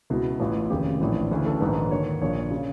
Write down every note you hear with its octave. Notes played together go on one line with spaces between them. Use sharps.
C#2 B2 E4
A1 A2 E3 F4
F1 D#2 C#3 G4
A#1 A2 E3
D2 C#3 E3
A4
A#1 G#2 D#3 B4
D#2 D3 C#5
A#1 A#2 C#5
C#3